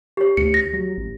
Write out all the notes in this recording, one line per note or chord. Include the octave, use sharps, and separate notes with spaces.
G4 C#5
D2 C#7
A#6
F#3
A1